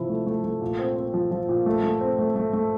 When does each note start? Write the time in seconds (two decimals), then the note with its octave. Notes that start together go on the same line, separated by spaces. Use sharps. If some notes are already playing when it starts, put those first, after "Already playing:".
Already playing: C3 F3 E4
0.10 A3
0.27 A3
0.44 A3
0.61 A#2
0.79 C4
0.96 C4
1.14 F3
1.31 F3
1.49 A#2
1.66 A3
1.84 A3
2.01 C4
2.19 A3
2.36 A3
2.53 A3